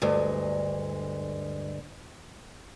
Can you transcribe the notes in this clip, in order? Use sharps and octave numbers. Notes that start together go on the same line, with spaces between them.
D2 G2 G#3